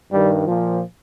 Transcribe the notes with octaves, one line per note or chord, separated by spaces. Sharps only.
G2 D#3 G3
A#2 F3